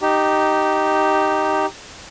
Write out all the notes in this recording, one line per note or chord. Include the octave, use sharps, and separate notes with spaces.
D#4 G4